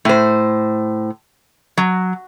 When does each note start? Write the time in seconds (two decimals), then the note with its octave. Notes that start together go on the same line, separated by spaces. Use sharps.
0.05 A2 C5
1.77 F#3